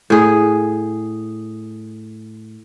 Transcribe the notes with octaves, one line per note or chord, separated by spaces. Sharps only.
A2 G#4